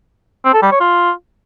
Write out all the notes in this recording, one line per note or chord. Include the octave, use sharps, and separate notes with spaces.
C4
A4
G3
C#5
F4